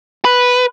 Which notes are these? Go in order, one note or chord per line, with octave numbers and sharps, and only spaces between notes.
B4